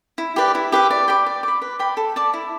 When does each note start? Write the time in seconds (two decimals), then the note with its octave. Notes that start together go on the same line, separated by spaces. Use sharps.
0.18 E4
0.36 G4 B4 D5
0.55 E4
0.72 G4 B4 E5
0.91 D5
1.08 G5 B5 D6
1.26 D5
1.43 B5 D6
1.62 B4
1.79 D5 G5 B5
1.97 A4
2.16 D5 A5 D6
2.34 E4